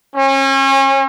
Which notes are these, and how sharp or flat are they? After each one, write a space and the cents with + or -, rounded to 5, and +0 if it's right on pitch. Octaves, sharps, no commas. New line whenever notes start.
C#4 -35